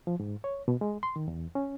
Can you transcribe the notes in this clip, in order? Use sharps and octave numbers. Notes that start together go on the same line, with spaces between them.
F3
G#2
C#5
B2
G#3
C6
D#3
E2
C#4